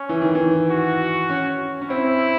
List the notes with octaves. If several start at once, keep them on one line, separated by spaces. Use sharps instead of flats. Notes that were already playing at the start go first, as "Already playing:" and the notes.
Already playing: C#4
E3
D#3
E3
F#4
C#4
C#4
C4 E4